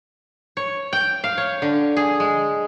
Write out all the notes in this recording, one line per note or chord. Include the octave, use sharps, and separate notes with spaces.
C#5
G5
F5
C#5
D3
G#4
G#3